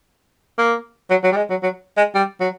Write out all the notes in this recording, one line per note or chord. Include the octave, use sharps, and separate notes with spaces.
A#3
F#3
F#3
G3
G#3
F#3
F#3
G#3
G3
F#3